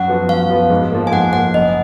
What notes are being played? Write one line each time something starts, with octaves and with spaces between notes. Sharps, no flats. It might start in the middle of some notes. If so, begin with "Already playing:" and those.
Already playing: F#2 F#5
F3 B3 F#4 B4
F#2 F5
F3 B3 F#4 B4
G#2
F3 A#3
G#5
G#2 F#5
F3 A#3 F#5
F#1 D#5